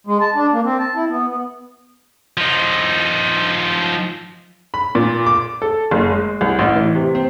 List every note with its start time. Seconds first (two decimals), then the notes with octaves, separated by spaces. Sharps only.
0.07 G#3
0.21 A5
0.35 D4
0.53 A#3
0.64 C4
0.79 A5
0.95 E4
1.08 B3
1.28 B3
2.37 F3 D#4
4.74 B5
4.95 A#2
5.26 D6
5.62 A4
5.91 F#1
6.11 G#3
6.41 C2
6.59 A1
6.76 E3
6.95 C3
7.15 C4